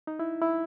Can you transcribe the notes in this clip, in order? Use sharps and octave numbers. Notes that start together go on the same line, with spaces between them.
D#4
E4
E4